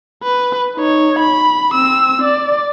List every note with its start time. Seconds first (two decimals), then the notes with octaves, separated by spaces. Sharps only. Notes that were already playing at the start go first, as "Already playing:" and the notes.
0.23 B4
0.76 D#4 C#5
1.19 B5
1.73 C4 E6
2.22 D5